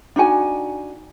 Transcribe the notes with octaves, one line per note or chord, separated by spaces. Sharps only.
D4 D#4 F#4 G#5